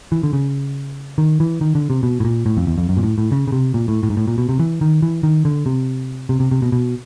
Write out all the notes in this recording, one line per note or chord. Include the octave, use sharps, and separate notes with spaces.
E3
D3
C#3
D#3
E3
D#3
D3
C3
B2
A2
A#2
A2
F2
E2
F2
F#2
A#2
A2
A2
C#3
C#3
C3
A#2
A2
A2
G#2
A2
A#2
B2
C3
E3
D#3
E3
D#3
D3
C3
C3
C3
C3
B2
B2